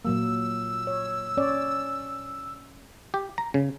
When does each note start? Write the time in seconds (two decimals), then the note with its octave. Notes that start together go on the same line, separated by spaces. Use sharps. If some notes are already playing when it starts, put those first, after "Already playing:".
0.05 A#2 F#3 A#3 E6
0.87 C#5
1.37 C#4 C#5 D5
3.14 G4
3.38 A#5
3.54 C#3